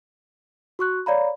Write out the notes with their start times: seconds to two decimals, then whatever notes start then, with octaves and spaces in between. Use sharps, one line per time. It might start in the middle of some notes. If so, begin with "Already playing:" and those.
0.79 F#4 C#6 F#6
1.06 C#5 D5 F5 A#5 B5